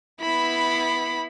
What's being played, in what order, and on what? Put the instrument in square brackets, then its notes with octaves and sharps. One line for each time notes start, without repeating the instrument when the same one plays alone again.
[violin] B3 E4 [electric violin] B5